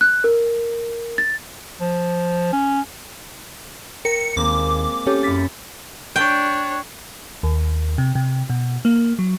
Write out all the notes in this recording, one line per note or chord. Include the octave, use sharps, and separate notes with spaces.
F#6
A#4
A6
F3
C#4
A#4 G5 C#7
D#2 G#3 A#3 C4 D6
C#4 G4 A4 C#5
F#2 E4 A6 B6 C#7
D4 C#5 G5
D#2
C3
C3
B2
A#3
F#3